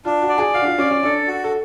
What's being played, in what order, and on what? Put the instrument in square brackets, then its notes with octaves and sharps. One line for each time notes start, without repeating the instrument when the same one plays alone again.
[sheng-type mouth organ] D4 [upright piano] F4
[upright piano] F#4
[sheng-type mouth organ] D5
[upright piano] G#4
[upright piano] F#4 [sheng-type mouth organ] F5
[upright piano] D4
F4
[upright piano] C#4 [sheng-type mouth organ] D5
[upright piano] C#4
[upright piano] D4 [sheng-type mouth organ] A4
[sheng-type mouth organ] F#4
[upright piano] A4